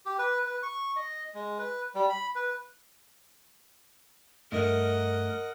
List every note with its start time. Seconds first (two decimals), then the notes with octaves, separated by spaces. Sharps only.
0.06 G4
0.19 B4
0.47 B4
0.63 C#6
0.96 D#5
1.34 G#3
1.59 B4
1.95 G3
2.09 B5
2.35 B4
4.52 G2 A3 A#4 D#5 F#5